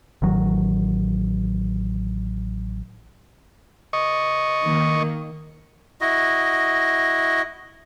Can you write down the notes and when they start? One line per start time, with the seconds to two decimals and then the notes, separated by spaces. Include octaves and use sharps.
0.22 A1 D#3 F#3
3.93 D#5 C#6
4.62 D#3 A#3
6.01 E4 F#4 D#5